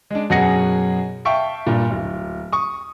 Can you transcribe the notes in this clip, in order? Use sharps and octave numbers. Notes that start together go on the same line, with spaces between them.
G#3 D4
F#2 B2 G#4 F#5 A#6 C#7
E5 F5 G5 A5 C#6
G2 A#2
D1
C#6 D#6